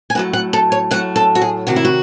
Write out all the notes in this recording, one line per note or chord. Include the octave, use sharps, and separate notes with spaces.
G#5
A2 F#3 A3 F#5
F#5
A4
C#5
A2 F#3 A3 F#5
A4
F#4
G#4
C3 D#3 F#3 F#4
E4
F#4